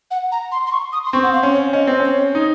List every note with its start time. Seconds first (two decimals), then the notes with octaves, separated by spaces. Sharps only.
0.11 F#5
0.32 A#5
0.52 C6
0.67 C6
0.72 C#6
0.93 D#6
1.05 C6
1.13 C4 C#6
1.23 F#5
1.33 F5
1.43 C#4
1.53 C#5
1.73 C#4 D#5
1.87 C4
2.00 C#4 C#5
2.35 D#4